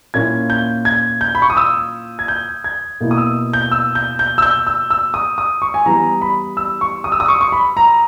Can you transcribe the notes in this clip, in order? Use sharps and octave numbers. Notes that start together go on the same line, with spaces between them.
A#2 A#3 C#4 E4 G#6
G6
G#6
G6
B5
C#6
D#6
E6
G#6
G6
G#6
B2 A#3 E4
D#6
E6
G6
E6
G6
G6
E6
G6
E6
E6
D#6
D#6
C#6
G#5
E3 G3 B3 E4 A#5
B5
E6
C#6
D#6
E6
D#6
C#6
C#6
B5
A#5